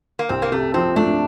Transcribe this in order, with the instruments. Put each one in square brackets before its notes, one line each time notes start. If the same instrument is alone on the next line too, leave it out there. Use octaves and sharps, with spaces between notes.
[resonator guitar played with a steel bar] A#3
[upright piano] C2 [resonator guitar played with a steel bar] C4
[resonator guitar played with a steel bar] A#3
[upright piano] C3 [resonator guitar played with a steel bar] A3
[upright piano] F3 [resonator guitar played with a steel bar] C4
[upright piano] A3 [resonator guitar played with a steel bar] D4